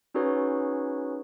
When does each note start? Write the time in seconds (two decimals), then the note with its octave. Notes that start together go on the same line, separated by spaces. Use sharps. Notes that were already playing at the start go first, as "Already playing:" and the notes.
0.14 C#4 D#4 F#4 G#4 B4 C#5